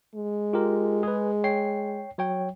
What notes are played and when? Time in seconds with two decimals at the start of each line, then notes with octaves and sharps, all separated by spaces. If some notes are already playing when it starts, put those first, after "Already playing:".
0.15 G#3
0.53 F4 G4 A#4
1.03 G#4 B4
1.44 C#5 G5 C7
2.18 F#3 C#5 G5